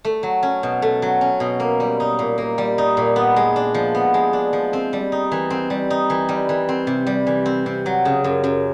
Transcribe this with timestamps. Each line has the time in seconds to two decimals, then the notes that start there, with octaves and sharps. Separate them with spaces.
0.05 A3
0.23 F#3
0.43 C#4
0.63 B2
0.82 A3
1.02 F#3
1.21 C#4
1.40 B2
1.60 A#3
1.80 G3
2.00 D#4
2.19 A#2
2.38 A#3
2.58 G3
2.78 D#4
2.97 A#2
3.16 B3
3.36 G#3
3.56 D4
3.74 F3
3.95 B3
4.14 G#3
4.33 D4
4.53 F3
4.73 C4
4.93 G3
5.12 D#4
5.32 E3
5.50 C4
5.70 G3
5.90 D#4
6.10 E3
6.29 G3
6.49 E3
6.69 C4
6.87 C3
7.07 G3
7.27 E3
7.46 C4
7.66 C3
7.86 F#3
8.05 C#3
8.24 F#2
8.44 F#2